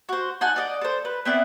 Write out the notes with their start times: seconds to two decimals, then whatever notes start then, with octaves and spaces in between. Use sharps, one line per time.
0.09 F#4 C5
0.41 D#4 F#5 G#5 A5
0.56 D5 D#5 F#5
0.81 A4 C5
1.05 B4
1.25 B3 C4 E4 D5